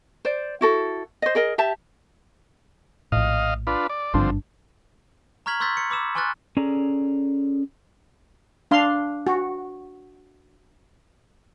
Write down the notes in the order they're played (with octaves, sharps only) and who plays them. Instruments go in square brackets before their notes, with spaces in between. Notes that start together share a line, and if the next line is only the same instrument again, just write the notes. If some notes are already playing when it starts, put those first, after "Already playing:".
[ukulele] C5 D5
E4 F#4 A4
C5 D#5
G#4 A#4 D#5
G4 E5 A5
[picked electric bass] A#1 A2 [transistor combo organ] D#5 F5
[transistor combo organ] D4 F4 B4
D5
[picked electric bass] G#1 G2 D4 [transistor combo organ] D3 F3 C4
[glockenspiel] A#5 C#6 F6 G#6 B6 F#7
C6 C#6 E6 G6 A6 B6
C#7
B5 D6 E6 E7
G#5 C6 C#6 F6 F#6 A6
[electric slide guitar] C#4 G#4 A4 D5 A#5
[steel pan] D4 F5 C6
F#4